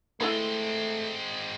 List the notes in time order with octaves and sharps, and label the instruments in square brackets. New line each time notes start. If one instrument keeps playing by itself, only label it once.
[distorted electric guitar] G#3 C4 [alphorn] A3 [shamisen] E4 A4 B4